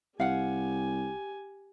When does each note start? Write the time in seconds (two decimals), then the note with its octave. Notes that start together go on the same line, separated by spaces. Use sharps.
0.20 C2 G4 F5 F#5 G#5